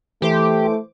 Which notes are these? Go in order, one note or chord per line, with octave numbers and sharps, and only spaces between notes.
E3 A3 G4 C5 D6